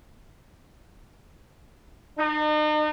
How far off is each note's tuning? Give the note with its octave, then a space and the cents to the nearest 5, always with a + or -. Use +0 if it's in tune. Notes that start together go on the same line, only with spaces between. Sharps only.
D#4 -40